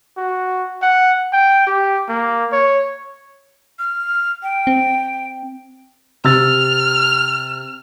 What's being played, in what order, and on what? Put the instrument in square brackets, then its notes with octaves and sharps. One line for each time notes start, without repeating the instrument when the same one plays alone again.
[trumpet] F#4
F#5
G5
G4
A#3
C#5
[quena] F6
G5
[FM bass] C4
[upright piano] C3 E6 A6 [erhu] F6